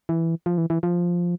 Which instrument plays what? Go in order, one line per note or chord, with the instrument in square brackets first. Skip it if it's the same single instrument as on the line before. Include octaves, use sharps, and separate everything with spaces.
[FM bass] E3
F3
E3
E3
F3